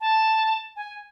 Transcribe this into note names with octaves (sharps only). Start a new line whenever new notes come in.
A5
G#5